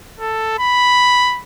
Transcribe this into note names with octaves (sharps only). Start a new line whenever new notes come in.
A4
B5